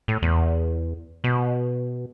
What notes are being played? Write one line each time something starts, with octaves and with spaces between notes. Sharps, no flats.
A2
E2
B2